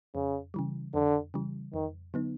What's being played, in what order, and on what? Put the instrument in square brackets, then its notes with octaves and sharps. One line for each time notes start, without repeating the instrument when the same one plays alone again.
[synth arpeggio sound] F2 [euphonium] C#3
[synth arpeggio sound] C#3 E3 G3
[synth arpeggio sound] F2 [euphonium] D3
[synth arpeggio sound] C#3 E3 G3
[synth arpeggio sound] F2 [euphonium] D#3
[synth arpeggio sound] D3 F#3 B3 D#4